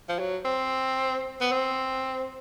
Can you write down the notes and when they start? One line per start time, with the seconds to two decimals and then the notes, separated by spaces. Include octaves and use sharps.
0.09 F3
0.19 F#3
0.45 C4
1.41 B3
1.52 C4